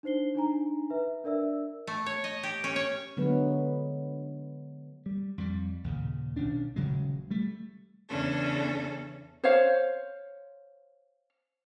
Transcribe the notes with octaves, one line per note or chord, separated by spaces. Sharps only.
D4 D#4 C5 C7 G7
D4 D#4 G#5 A#5
B4 E5
D4 A#4 D5 E5 E6
A3
C#5
D#5
G4
C#4
C#5
D3 F#3 G#3 B3 B4
G3
F2 G3
D#2 A#2 C#3
B1 D#3 C#4 D4
D#1 C#3 F#3 G#3
G3 A3
E2 C#3 C#4 D4 A4
C5 C#5 F5